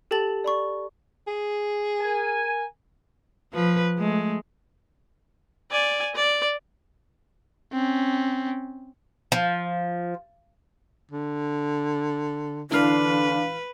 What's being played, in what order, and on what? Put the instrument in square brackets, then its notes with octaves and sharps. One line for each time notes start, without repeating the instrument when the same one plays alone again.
[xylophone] G4 A4 G5 A5 A6 F#7
D5 B5 C#6
[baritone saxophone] G#4
[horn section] A#4 G#5
[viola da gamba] F3 B4
G#3 A3
[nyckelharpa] D5 G#5
D5
[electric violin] C4 C#4
[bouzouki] F3
[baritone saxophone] D3
[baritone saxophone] D3 [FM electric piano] E3 F5 [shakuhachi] D4 [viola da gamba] B4